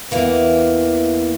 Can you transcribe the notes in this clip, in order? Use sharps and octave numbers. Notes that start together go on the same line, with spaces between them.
E2 E3 A#3 D#4